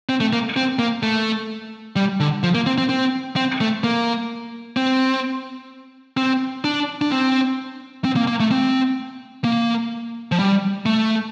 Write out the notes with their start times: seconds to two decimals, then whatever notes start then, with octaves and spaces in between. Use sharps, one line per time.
0.09 C4
0.20 A3
0.33 A#3
0.57 C4
0.79 A#3
1.03 A3
1.96 G3
2.20 D3
2.43 F3
2.55 A#3
2.66 C4
2.78 C4
2.89 C4
3.36 C4
3.61 A3
3.84 A#3
4.77 C4
6.17 C4
6.64 D4
7.01 D4
7.12 C4
8.05 C4
8.16 A#3
8.28 A#3
8.40 A3
8.51 C4
9.44 A#3
10.32 F3
10.39 G3
10.86 A3